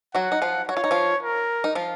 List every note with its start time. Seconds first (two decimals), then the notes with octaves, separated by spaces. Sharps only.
0.15 F#3 F#4 F#5
0.32 D#4
0.42 F3 F4
0.69 F#4 C#5
0.77 F4
0.84 D#4
0.91 F3 F4
1.23 A#4
1.64 D#4
1.75 F3 F4